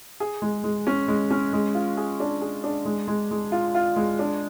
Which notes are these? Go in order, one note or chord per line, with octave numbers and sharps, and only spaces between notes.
G#4
G#3
G#3
C#4
G#3
C#4
G#3
F4
G#4
D4
G#4
D4
G#3
G#3
G#3
F4
F4
G#3
D4